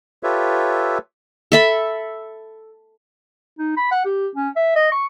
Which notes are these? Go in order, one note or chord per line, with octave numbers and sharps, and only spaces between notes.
F4 G4 A4 B4 C#5 E5
A4 E5 B5
D#4
B5
F#5
G4
C#4
E5
D#5
C#6